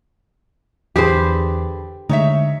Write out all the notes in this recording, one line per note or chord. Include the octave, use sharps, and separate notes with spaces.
E2 D3 G4 G#4 B4 C5
D3 G#3 A3 D#4 C#5 E5